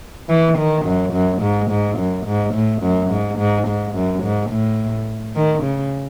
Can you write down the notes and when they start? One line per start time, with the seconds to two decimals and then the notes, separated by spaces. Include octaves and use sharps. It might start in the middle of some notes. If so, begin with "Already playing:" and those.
0.29 E3
0.58 D#3
0.85 F#2
1.13 F#2
1.42 G#2
1.70 G#2
1.98 F#2
2.26 G#2
2.54 A2
2.82 F#2
3.11 G#2
3.38 G#2
3.67 G#2
3.95 F#2
4.23 G#2
4.50 A2
5.36 D#3
5.63 C#3